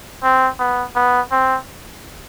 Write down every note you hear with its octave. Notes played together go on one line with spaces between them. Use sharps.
C4
B3
B3
C4